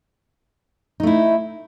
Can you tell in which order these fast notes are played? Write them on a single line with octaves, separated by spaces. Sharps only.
D#4 A3 E4